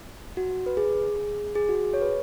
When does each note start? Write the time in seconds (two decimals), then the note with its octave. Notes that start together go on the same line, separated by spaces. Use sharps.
0.37 F#4
0.66 B4
0.77 G#4
1.16 G#4
1.55 G#4
1.69 F#4
1.75 G#4
1.94 C#5
2.01 B4